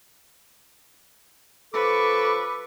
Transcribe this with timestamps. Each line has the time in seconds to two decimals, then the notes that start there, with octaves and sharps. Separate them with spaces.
1.74 F3 A4 B4 C#6 D6